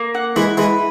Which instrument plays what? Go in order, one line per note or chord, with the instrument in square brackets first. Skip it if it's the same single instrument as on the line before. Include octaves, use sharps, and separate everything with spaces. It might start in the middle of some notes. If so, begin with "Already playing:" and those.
Already playing: [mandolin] A#3
F#5
[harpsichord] E3 G#3 [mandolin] E4
[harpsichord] E3 G#3 [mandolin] B4